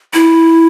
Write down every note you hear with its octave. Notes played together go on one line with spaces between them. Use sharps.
E4